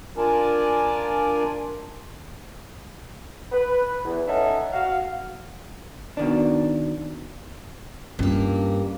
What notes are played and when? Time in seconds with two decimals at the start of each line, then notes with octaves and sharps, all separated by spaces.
0.17 D4 F4 A#4 D5 G#5 A5
3.52 B4
4.04 E2
4.27 C#4 D#4 A4 E5 F#5
4.73 F#4 F5
6.17 B2 D#3 D4
8.19 G2 A#3 C#4 F4